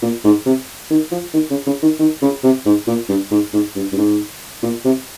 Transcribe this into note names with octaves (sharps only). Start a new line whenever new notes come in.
A#2
G#2
C3
D#3
F3
D#3
C#3
C#3
D#3
D#3
C#3
C3
G#2
A#2
G2
G#2
G#2
G2
G2
G#2
A#2
C3